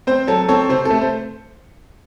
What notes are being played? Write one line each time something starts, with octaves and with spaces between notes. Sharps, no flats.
C4 C5
F#3 A4
C4 A4 C#5
C3 C5
A4
A3
C5